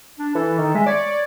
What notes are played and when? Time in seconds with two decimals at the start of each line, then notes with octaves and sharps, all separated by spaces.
0.19 D4
0.35 E3 A4
0.58 D#3
0.75 G#3 E5
0.86 C#5 D5